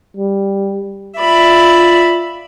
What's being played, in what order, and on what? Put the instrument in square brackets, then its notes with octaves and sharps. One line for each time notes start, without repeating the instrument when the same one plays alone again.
[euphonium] G3
[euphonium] F4 [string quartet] D5 E5 B5